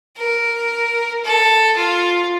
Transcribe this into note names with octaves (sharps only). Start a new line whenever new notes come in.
A#4
A4
F4